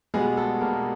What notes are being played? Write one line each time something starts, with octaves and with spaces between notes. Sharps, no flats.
B2 G3 G#3 B3 G#4
A3 A4
B2 G3 A#3 B3 A#4